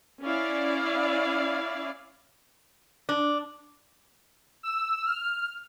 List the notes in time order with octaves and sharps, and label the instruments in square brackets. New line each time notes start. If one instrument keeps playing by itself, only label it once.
[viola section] C#4 E4 D5 F5
[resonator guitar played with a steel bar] D4
[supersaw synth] E6
F6